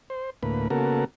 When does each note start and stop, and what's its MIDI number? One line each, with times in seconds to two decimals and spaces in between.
0.10 0.30 72
0.43 0.68 38
0.43 0.68 45
0.43 0.68 58
0.43 0.68 71
0.70 1.04 49
0.70 1.04 58
0.70 1.04 59
0.70 1.04 66
0.70 1.04 69
0.70 1.04 70